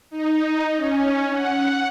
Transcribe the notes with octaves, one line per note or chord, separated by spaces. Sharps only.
D#4
C#4
F#5